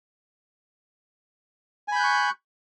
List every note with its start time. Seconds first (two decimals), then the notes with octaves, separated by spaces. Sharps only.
1.88 G#5
1.92 B5
1.96 G6
2.00 F#6
2.04 C#6